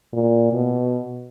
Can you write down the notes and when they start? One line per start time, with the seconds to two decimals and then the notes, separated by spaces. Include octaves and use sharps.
0.13 A#2
0.53 B2